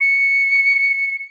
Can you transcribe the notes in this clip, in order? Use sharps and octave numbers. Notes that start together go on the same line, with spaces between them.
C#7